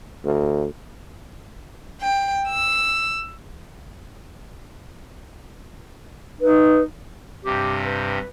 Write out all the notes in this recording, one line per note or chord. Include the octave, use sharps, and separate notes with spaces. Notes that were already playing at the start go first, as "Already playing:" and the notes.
D2
G5
E6
D#4 B4
G2 C3 G4
B4